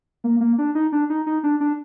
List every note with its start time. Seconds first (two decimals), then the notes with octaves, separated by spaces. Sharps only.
0.24 A#3
0.41 A#3
0.58 D4
0.75 D#4
0.92 D4
1.10 D#4
1.26 D#4
1.43 D4
1.60 D4